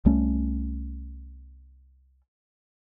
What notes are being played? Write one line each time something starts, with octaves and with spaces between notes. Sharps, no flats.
C2 G3 A3 C#4